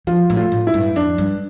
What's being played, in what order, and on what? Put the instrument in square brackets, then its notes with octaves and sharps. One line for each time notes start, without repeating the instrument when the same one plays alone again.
[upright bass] F3 [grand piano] F4
[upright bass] A2
[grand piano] F4
[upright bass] A2
[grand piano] E4
[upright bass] G2
[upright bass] F2 [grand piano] D4
[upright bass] G2